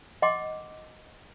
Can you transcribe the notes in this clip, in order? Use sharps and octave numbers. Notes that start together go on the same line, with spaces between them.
D#5 F#5 C6 D6